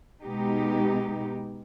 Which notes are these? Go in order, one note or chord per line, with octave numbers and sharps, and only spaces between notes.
B2 G#3 B3 D#4 G4